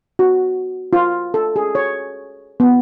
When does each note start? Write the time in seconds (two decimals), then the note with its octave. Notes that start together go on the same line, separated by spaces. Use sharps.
0.19 F#4
0.93 F4
1.34 A4
1.56 G#4
1.75 C#5
2.60 B3